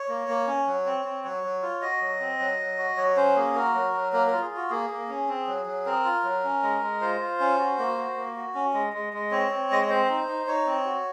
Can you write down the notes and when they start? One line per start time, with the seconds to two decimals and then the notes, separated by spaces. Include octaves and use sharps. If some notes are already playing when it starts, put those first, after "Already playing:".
Already playing: C#5
0.09 A#3
0.28 A#3
0.47 C#4
0.67 F#3
0.86 C4
1.05 C4
1.24 F#3 C#5
1.44 F#3
1.62 F4
1.82 F#4 D#5
2.01 F#3
2.20 C4
2.40 F#3
2.59 F#3
2.79 F#4
2.97 F#3 C#5
3.17 C#4 C5
3.36 A#3 G#4
3.55 F#4 A#4
3.74 F#3
3.94 F#3
4.13 A#3 A#4
4.27 F4 A#4
4.41 G#4
4.51 F4
4.57 F#4
4.70 A#3 G#4
4.90 A#3
5.09 C#4
5.29 C4
5.47 F#3
5.66 F#3
5.86 C4 A#4
6.05 F4
6.24 F#3
6.44 C#4
6.63 G#3
6.82 G#3
7.01 F4 C5
7.20 F4
7.40 C#4
7.59 F#4
7.78 A#3
7.97 F#4
8.16 A#3
8.36 F#4
8.55 C#4
8.74 G#3
8.93 G#3
9.13 G#3
9.31 C4 C#5
9.51 C4
9.71 G#3 D#5
9.82 C#5
9.90 C4 C5
10.09 D#4
10.28 D#4
10.47 D#4 C#5
10.66 C4
10.85 F#4